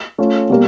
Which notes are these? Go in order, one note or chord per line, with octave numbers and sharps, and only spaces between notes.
A3 C#4 F4
B2 G3 A#3